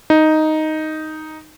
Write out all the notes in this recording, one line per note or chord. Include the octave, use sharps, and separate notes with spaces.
D#4